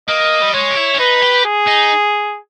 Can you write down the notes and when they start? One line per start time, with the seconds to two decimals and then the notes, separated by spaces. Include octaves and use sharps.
0.08 A#3 D#5
0.42 G3
0.54 G#3 C#5
0.71 G4
0.77 E4
0.94 C#4
0.99 D#4 B4
1.22 G4
1.45 G#4
1.67 D#4